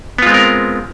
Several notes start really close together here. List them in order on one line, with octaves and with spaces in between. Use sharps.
B3 F4 G#3 C4 A#4